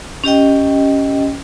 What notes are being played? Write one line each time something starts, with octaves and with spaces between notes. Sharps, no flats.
C#4 G4 D#5 G5